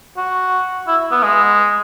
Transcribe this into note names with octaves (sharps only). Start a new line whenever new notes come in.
F#4
E4
B3
G#3